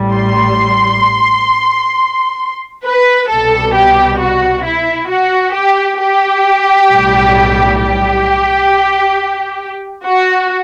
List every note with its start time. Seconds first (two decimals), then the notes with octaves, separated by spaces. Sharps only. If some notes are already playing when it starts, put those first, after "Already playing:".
Already playing: A1 A2 G3
0.14 C6
2.85 B4
3.29 C2 B2 G3 A4
3.74 G4
4.20 F#4
4.65 E4
5.09 F#4
5.54 G4
6.00 G4
6.90 B1 A2 G3
7.80 G4
10.05 F#4